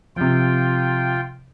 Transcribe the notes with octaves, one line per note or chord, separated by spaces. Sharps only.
C3 F3 F4 G5